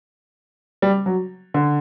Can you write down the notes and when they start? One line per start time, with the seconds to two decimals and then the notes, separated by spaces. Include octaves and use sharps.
0.82 G3
1.06 F#3
1.54 D3